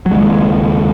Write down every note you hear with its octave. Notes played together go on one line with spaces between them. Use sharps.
F#3
D#2 C#3 G#3